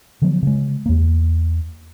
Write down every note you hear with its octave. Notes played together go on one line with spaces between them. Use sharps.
D3 F3 F#3 B3
C#3 G#3
E2 A#3